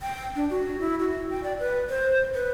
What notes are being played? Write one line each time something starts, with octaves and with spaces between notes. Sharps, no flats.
G5
D4
F#4
E4
F#4
G5
D5
B4
C5
B4